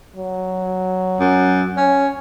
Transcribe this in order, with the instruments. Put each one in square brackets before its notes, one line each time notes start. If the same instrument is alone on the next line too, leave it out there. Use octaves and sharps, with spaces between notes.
[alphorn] F#3
[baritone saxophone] F#2
[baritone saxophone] C#4 [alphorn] C#5